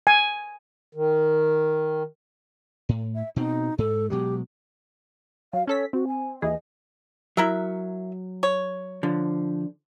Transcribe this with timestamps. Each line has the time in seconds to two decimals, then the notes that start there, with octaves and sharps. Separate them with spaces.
0.07 G#5
0.95 D#3
2.89 A2
3.15 E5
3.36 B2 C4 D#4
3.78 G#2 A4
4.10 B2 F#3 G#3 G4
5.53 F#3 F5
5.67 C#4 A4 C#5 B6
5.93 C4 F#4
6.08 G#5
6.42 D#2 E3 G#4 D#5
7.37 F#3 E4 A#4 E5
8.43 C#5
9.03 D3 F3